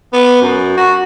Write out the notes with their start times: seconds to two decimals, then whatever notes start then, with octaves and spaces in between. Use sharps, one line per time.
0.13 B3
0.42 F#2
0.77 F#4